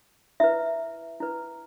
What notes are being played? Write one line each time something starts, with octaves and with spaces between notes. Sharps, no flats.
E4 B4 E5
E4 B4